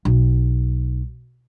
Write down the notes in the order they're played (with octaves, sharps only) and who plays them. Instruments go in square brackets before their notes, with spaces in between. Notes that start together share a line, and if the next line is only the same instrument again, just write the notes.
[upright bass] B1